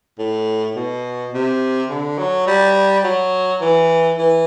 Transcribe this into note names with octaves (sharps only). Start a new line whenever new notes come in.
A2
B2
C3
D3
F#3
G3
F#3
E3
E3